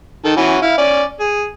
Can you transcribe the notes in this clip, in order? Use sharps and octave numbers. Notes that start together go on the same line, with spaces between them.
D#3 A4
E3 C#4 F#4
E4 F5
C#4 D5
G#4